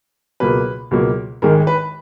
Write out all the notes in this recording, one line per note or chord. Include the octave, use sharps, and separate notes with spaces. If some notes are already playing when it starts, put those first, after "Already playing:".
C#2 B2 F#3 A#3 B4
C#2 B2 F#3 A#3
G#1 G#2 D#3 G#3 A#4
B4